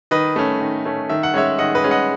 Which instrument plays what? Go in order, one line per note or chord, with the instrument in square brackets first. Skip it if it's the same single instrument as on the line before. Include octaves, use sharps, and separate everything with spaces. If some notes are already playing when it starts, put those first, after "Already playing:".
[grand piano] D#3 B4 D#5
A3 C#4
D#3
A3 C#4
D#3 E5
F#5
G#3 C#4 C#5 E5
D#3 D#5 F#5
B4 D#5
G#3 C#4
D#5 F#5